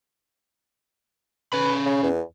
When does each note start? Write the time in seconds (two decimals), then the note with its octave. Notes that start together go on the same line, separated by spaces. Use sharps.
1.53 C#4 B4 B5
1.86 C#3
2.03 E2